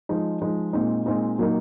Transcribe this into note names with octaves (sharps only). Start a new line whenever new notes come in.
F3 G#3 D#4
F3 G#3 D#4
A#2 G#3 C4 D#4
A#2 G#3 C4 D#4
A#2 F#3 A#3 D#4